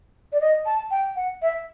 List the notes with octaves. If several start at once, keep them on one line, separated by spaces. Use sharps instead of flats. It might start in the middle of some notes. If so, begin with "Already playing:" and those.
D5
D#5
A5
G5
F#5
E5